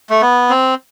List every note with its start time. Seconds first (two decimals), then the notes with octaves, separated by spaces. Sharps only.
0.10 A3
0.22 B3
0.50 C4